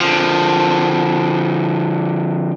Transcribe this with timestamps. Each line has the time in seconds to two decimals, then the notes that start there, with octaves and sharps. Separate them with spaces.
0.01 D3 F3